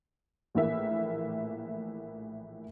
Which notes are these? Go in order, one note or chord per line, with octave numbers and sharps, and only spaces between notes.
A#1 A2 E3 A#3 E5